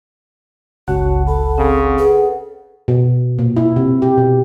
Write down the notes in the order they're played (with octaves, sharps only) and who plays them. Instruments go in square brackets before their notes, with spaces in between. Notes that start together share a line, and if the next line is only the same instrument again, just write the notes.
[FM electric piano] G1 C#2 F#5 [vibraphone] C#4 C#5 A5 [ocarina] F#4
[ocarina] A4 [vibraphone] A5 B5
[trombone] C#3 [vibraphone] C4
[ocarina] G#4 [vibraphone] A4 B4 F#5
[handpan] B2
A#2
E4
C3
G4
B2